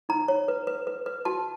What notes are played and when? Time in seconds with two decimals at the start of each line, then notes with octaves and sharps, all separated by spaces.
0.09 D#4 A#5
0.28 C#5
0.48 B4
0.67 B4
0.87 B4
1.06 B4
1.25 F#4 A5